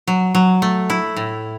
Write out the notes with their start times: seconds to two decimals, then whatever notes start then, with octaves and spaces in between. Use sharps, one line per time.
0.07 F#3
0.35 F#3
0.62 A3
0.90 E4
1.16 A2